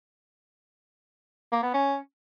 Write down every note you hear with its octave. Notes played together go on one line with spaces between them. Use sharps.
A#3
B3
C#4